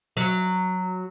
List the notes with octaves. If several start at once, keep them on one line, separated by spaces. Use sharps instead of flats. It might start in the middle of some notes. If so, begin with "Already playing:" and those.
F#3